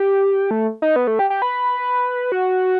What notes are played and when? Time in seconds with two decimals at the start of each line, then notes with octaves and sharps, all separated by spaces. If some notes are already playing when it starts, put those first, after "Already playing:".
Already playing: G4
0.51 A3
0.82 D#4
0.96 B3
1.07 A3
1.19 G4
1.30 G4
1.42 B4
2.32 F#4